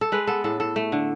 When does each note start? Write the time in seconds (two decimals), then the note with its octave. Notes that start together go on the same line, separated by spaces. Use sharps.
0.01 A4
0.12 G#3 B4
0.27 B3 A4
0.44 A2 A4
0.60 A2 A4
0.76 A3
0.92 D3